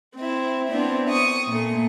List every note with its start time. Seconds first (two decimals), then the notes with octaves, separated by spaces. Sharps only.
0.16 C4 E4
0.69 B3 C4 D4 E4
1.09 C#6 D#6
1.47 A#2 A3